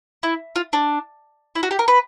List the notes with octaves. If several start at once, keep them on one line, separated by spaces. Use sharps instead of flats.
E4
F4
D4
E4
F#4
G4
A#4
B4